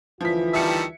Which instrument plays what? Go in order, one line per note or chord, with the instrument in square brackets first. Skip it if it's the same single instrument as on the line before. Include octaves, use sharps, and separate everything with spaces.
[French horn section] D2 E3 F4 [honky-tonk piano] F3 B6
[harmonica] D#3 G3 A5 [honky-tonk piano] E5 C#7